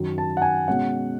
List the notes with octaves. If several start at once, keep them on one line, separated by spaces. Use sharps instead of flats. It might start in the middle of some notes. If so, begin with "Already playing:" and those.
Already playing: F#2 D#3 F#3
A5
F#5
G#5
B2 G#3 C#4 F#5